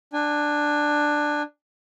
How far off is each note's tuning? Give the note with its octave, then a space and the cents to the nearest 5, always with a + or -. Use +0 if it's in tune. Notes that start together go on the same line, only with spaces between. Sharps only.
D4 +10 G#5 -25